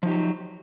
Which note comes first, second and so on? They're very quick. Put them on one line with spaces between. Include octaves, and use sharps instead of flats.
F3 D#4 G4 F#3